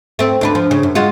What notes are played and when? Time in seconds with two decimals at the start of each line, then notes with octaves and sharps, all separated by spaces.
0.19 A3 C4
0.41 D2 D4 B4
0.55 F3
0.71 C#3
0.83 F#2
0.95 G#3 F4 F#4